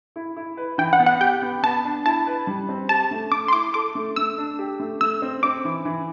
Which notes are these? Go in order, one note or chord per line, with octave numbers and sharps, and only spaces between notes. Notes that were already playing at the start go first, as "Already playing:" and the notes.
E4
E4
B4
E3 G5
F#5
B3
F#5
G4 G5
B3
B3 A5
D4
E4 A5
B4
G3
C4
G4 A5
A3
A3 D6
C6
E4 D6
A4 D6
A3
A3 E6
D4
G4
A3
A3 E6
C4
C4 D6
E3
E3